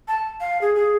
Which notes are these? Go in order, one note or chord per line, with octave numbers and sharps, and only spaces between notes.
A5
F5
G#4
G#4